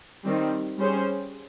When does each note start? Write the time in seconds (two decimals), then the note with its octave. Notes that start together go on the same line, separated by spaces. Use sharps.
0.24 D#3 G3 C4
0.78 G3 C#4 G#4 C5